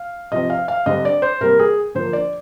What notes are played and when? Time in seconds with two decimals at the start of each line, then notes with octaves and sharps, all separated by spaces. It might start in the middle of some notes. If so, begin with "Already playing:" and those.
Already playing: F5
0.32 C3 F3 C4 D#5
0.50 F5
0.68 F5
0.86 D3 G3 C4 D#5
1.05 D5
1.22 C5
1.41 C3 G3 A#3 A#4
1.59 G#4
1.95 D3 F3 A#3 C5
2.13 D5